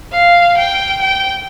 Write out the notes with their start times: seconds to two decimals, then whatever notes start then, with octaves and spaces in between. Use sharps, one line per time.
0.12 F5
0.57 G5
1.02 G5